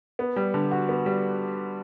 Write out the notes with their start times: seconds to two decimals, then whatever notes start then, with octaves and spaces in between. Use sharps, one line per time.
0.19 B3
0.36 G3
0.54 D3
0.71 F#4
0.89 B3
1.06 G3